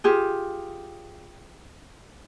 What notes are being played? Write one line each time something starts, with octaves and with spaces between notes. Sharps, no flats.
F4 G4 G#4